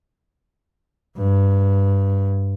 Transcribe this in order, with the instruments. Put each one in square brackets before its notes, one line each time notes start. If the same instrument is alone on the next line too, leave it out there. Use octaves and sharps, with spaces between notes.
[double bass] G2